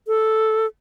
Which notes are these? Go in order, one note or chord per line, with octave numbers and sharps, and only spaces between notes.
A4